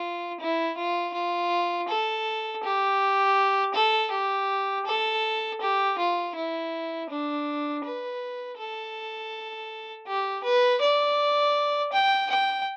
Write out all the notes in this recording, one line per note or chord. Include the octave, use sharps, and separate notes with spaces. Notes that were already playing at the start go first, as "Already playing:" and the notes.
Already playing: F4
E4
F4
F4
A4
G4
A4
G4
A4
G4
F4
E4
D4
B4
A4
G4
B4
D5
G5
G5